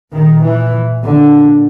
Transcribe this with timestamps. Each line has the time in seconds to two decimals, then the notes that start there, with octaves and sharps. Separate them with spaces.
0.13 A#2 D#3
0.42 E3
1.02 A#2 D3